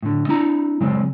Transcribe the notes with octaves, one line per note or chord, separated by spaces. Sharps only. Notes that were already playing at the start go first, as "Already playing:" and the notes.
A2 D3
C4 D4 E4 A#5
C#3 F#3 G#3 C4